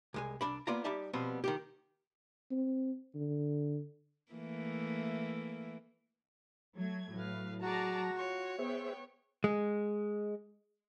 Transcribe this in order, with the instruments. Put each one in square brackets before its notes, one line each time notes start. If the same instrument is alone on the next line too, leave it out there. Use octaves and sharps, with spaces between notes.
[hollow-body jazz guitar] C2 G#3 G#5
C2 G#2 D4 B5
A#3 B3 F4 D5 F5 A#5
G3 D#4 G4 D5 E5 A5
B2 F3 G3 B3 C4
D#3 F3 G4
[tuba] C4
D3
[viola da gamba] E3 A3 A#3
[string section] F#3 A3 G#6
[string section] A2 [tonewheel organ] F#3 [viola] B4 F5
[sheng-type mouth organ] F#4 [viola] G#4 D5 [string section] A5 A#5
[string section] F4 [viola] C#5
[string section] B3 G5 [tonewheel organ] G#4 C5 E5
[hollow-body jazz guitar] G#3